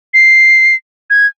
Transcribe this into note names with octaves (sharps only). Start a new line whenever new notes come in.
C7
G#6